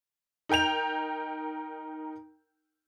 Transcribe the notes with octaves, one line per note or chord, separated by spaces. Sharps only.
D#4 A#4 G5 G6 F7